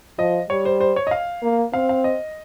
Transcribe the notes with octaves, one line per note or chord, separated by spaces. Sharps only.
F3 D#5
G3 C#5
C5
C5
C#5
D#5
F5
A#3
C4 F5
F5
D#5